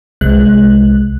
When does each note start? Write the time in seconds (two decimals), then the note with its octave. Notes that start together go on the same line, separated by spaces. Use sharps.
0.21 C2 G#3 F#6